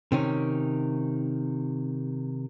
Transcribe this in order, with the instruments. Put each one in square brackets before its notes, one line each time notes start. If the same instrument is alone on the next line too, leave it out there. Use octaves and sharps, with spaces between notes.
[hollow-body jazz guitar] C3 D#3 C#4